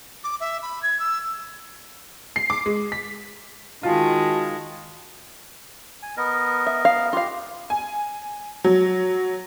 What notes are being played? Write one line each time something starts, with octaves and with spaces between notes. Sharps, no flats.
D6
E5
B5
G#6
E6
C7
D6
G#3
B6
D#3 G#3 F4 F#4 A5
G#5
B3 A#4 D#5
E5
F5
F4 G4 F5
G#5
F#3